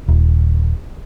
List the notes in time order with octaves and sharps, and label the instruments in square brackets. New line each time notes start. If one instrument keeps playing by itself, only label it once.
[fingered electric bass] D#1